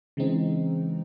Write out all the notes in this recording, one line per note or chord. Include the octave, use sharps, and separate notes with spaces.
C#3 E3 G#3 C4 D#4